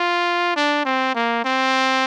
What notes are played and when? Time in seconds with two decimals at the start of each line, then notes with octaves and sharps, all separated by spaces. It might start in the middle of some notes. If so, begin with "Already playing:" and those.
Already playing: F4
0.56 D4
0.85 C4
1.15 A#3
1.45 C4